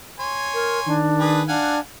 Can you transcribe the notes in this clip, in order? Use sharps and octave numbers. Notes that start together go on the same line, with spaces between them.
C#5 G#5 C6
A#4
D#3 D4
G#4 B4
D4 F5 F#5 G#5